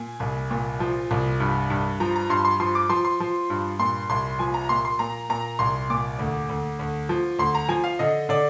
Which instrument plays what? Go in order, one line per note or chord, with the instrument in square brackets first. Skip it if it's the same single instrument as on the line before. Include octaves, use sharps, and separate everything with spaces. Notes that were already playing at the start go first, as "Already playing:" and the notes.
Already playing: [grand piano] A#2 G#5
C2
A#2
F3
C2
G2
G2
F3 A#5
A#5
G2 C6
C6
F3 C6
D6
F3 C6
C6
F3
G2
A#2 C6
C2 C6
F3 G#5
A#5
A#2 C6
C6
A#2 A#5
A#2 A#5
C2 C6
A#2 D6
D2
D2
D2
F3
D2 C6
A#5
F3 G#5
F5
D3 D#5
D3 D5